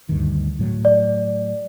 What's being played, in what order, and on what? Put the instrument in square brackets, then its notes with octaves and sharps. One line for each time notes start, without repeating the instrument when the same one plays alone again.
[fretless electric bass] D2 G2 D#3
A2 F#3
[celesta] D5